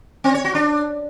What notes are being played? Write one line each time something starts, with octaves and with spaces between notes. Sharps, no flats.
C4
C#5
F#4
D4